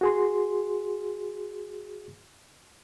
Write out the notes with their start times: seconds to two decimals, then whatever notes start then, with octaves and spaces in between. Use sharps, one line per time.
0.01 F#4 G#4 C6